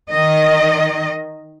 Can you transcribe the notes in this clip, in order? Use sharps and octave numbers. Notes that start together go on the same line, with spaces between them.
D#3 D#5